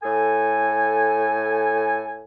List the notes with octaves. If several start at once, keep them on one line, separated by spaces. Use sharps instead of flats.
A2 A4 G#5